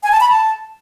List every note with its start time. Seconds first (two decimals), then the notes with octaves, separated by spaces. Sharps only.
0.03 G#5
0.12 A5
0.21 B5
0.29 A5